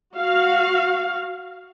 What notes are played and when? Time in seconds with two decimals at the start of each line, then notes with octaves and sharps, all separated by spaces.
0.15 F#4 F5